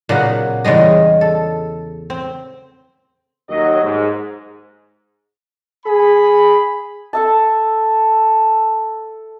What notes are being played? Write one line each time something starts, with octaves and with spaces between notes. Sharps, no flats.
A#2 C#3 F#3 B3 F#5
E2 C#3 G3 G#3 D#5
A4
C4
D#2 F#3 D#5
G#2
G#4 B5
A4 E5 A5